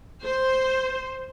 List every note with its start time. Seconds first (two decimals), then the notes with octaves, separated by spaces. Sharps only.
0.25 C5